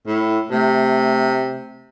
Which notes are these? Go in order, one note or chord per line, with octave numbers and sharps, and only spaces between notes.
A2
C3 A3